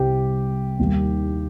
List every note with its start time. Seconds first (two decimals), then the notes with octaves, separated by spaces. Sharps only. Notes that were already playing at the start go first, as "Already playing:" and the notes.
Already playing: C2 C3 G3 G4
0.79 D#2 D#3 G3